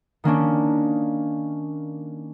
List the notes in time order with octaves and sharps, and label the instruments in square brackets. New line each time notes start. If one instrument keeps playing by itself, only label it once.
[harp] D#3 A#3 C#4 D4